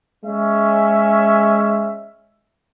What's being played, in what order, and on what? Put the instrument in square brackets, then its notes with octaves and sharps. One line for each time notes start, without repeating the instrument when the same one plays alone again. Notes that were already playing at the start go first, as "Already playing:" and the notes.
[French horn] G#3 [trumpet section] C#4 E5